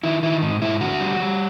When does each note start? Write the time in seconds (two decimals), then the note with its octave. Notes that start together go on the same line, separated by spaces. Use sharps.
0.03 D#3 E4
0.23 D#3 E4
0.42 G#2 D#4
0.62 G#2 E4
0.81 D3 F#4
1.00 G3
1.20 G3